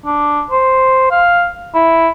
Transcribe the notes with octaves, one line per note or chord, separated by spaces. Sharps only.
D4
C5
F5
E4